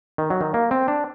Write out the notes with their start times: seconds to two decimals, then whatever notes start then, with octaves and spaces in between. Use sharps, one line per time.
0.18 D#3
0.30 F#3
0.41 D#3
0.54 A#3
0.71 C4
0.88 D4